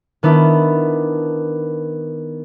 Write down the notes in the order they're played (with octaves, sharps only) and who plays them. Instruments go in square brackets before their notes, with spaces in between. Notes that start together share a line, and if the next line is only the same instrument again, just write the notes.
[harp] D#3 B3 D4 E4